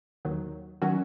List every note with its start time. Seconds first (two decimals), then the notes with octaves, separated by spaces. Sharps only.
0.25 D#2 D#3 F#3
0.82 D#3 F#3 C#4 F#4